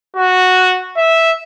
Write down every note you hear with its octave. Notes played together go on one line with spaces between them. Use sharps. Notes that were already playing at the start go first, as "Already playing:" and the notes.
F#4
E5